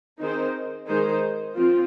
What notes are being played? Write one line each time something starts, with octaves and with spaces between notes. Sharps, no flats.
D#3 C4 D#4 G#4 C5
D#3 G#3 D#4 G#4 C5
F3 C4 F4